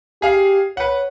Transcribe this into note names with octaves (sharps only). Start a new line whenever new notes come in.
G4 G#4 F5
B4 C#5 F#5